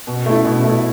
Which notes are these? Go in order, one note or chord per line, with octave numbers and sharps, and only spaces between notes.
B2
A3 E4
B2
A3 E4